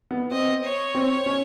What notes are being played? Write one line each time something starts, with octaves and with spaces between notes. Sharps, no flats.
B3
C4 D#5
C#5
C4
C#4